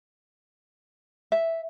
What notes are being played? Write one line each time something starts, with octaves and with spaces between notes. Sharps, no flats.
E5